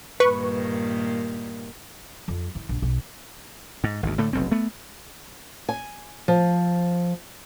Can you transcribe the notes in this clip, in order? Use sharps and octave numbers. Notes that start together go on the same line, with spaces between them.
G2 A#2 D#3 B4 C#6
F2
E3
A#1
B1
G#2
G#1 D2
A2 D3 A3
F1 B1 C4
A3 B3
G#5
F3